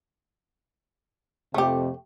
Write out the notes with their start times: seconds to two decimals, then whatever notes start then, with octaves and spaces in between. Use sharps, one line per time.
1.54 F2 C3 A3 G4